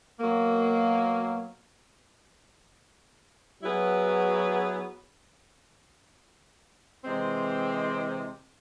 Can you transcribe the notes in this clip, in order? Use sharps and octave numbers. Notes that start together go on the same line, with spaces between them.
B2 F#3 A#3
F#3 B3 E4 G#4 B4
C3 E3 G#3 C4